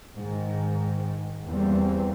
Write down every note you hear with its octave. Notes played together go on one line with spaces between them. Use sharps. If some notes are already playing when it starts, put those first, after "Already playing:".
G#2 D#3
E2 E3 G3 A#3 C4